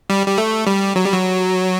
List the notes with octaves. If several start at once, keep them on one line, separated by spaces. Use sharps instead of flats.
G3
G3
A3
G3
F#3
G3
F#3